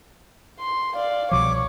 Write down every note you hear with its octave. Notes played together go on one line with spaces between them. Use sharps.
C6
D5 F5
C2 B2 F3 C#5 D6